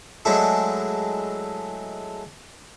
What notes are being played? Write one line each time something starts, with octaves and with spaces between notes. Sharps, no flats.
F#3 G#3 A3 D4 E4